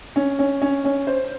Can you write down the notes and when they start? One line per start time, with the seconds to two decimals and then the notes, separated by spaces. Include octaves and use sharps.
0.16 C#4
0.39 C#4
0.62 C#4
0.85 C#4
1.07 C5